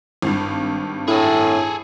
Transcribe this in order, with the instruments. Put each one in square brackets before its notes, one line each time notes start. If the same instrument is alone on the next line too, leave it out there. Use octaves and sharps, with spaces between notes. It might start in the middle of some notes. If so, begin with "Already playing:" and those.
[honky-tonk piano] G#1 G2
[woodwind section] A2 [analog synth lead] E4 [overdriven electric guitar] G#4 A4